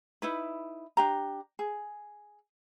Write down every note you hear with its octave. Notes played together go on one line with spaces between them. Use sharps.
D#4 E4 B4
D4 G4 A#5
G#4